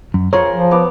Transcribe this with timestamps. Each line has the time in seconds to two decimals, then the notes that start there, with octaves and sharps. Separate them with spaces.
0.14 F#2
0.33 F4 G#4 A#4 C5 C#5
0.52 F3
0.71 B3 D6